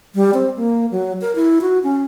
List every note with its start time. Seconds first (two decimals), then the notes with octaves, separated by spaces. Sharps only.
0.15 G3
0.34 C4
0.56 A#3
0.91 F#3
1.21 A#4
1.36 E4
1.61 F#4
1.84 C#4